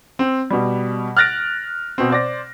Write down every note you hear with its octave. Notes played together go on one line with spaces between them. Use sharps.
C4
B2 G3
F6 F#6 A6 A#6 D7
B2 C4
C5 D5 A#6